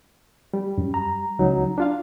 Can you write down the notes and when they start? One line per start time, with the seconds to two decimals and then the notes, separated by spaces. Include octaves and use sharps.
0.54 G3
0.78 F#2
0.94 A#5
1.39 C#2 F#3 D#4
1.78 D4 F4 F5